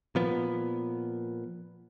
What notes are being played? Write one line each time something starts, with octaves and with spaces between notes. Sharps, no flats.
A#2 F3 B3